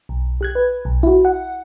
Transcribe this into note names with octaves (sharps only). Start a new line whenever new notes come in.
B1
G4 F#6 G#6
B4
B1
E4 F#4
F#5